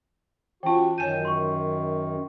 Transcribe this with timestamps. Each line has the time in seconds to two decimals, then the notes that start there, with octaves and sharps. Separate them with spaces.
0.63 E3 C#4 F4 F#4 G5 A5
0.98 F#2 D#3 C#5 G#5 A5 G6 D#7
1.25 C6 C#6